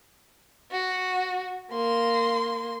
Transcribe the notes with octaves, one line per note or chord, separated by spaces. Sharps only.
F#4
A#3 C6